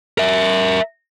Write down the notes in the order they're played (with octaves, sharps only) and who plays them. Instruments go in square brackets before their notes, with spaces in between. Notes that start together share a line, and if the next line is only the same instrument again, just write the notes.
[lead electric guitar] A#4 E5